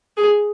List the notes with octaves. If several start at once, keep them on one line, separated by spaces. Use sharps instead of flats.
G#4